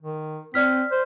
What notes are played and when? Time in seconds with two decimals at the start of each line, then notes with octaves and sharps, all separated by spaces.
0.01 D#3
0.54 C4 D5 F6 B6
0.91 C5